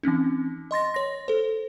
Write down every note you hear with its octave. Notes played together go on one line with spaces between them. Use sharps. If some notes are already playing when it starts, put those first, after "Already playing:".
E3 C4 C#4 D#4
D#5 C6 A6 A#6
C#5 A#6
A4 C5